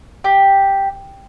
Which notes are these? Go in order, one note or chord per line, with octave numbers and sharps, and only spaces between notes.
G4